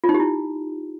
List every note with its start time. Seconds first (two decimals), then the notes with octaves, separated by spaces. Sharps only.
0.04 F4
0.09 D#4
0.14 G4
0.20 E4